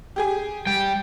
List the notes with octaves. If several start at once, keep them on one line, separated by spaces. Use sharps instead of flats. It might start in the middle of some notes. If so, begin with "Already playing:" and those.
G4 G#4 G#5
G3 G5